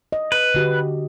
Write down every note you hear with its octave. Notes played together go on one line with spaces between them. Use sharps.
D#5
B4
D3 F#4 G4